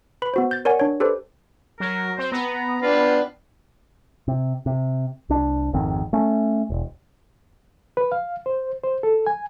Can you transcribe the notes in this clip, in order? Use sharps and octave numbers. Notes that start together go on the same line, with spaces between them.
B4 B5
B3 F#4 C5
G6 A6
A#4 C#5 D5 F#5 G#5
D4 C#5
G4 A4 B4 C5 D5
F#3 A#4
C4 C5
B3 A#5
D4 F4 B4 G5
C3
C3
C2 D4
G#1 F2 D#3 C4
A3 C#4
E1
B4
F5
C5
C5
A4
G#5